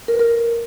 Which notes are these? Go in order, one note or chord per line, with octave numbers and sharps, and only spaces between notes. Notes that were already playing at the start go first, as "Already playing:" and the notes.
A#4
B4
A#4